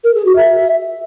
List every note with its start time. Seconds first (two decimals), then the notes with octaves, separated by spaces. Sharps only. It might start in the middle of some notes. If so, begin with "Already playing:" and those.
0.04 A#4
0.15 G#4
0.25 F#4
0.36 E5